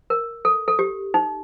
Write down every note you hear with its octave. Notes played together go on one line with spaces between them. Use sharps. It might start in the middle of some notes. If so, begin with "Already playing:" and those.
A#4
A4
A4
G4
D#4